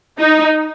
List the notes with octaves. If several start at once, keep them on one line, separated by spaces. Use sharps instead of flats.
D#4